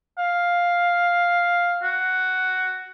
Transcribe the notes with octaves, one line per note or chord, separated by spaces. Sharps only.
F5
F#4